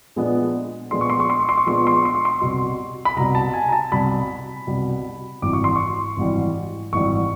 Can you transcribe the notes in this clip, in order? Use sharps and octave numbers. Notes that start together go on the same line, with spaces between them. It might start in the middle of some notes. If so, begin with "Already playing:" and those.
A#2 F3 G#3 B3 D4
A#2 F3 G#3 B3 D4 C6
C#6
C6
C#6
C6
C#6
C6
C#6
A#2 F3 G#3 B3 D4 C6
C#6
C6
C#6
C6
C#6
C6
C2 B2 G3
B5
C2 B2 G3 A#5
A5
G#5
A#5
A5
C2 B2 G3 B5
C2 B2 G3
G#1 G#2 E3 G3 D6
C#6
C6
C#6
G#1 G#2 E3 G3
G#1 G#2 E3 G3 C#6